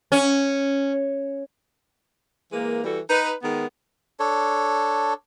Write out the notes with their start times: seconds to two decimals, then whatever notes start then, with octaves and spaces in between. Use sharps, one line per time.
0.12 C#4
2.52 E3 G#3 A#3
2.84 E3 G3 F#4 A4
3.09 D#4 B4
3.42 D#3 G#3 B3 A#4
4.20 D4 A4 C#5